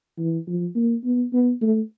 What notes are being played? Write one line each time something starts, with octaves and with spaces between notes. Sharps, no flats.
E3
F3
A#3
B3
B3
A3